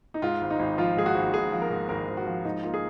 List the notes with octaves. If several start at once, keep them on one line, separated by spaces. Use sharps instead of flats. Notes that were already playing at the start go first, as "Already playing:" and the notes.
D#4
G#2 F4
G#1
D#4
G#1
F3 F4
G#2 G#4
F#4
G#1
G#1 G#4
F3
A#4
G#2
G#1 A#4
G#1
F#4
F3
G#2 D#4
A#3 F4
G#4